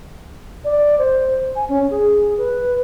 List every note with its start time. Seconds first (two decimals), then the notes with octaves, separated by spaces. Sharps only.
0.64 D5
0.98 C5
1.56 G#5
1.69 C#4
1.90 G#4
2.37 B4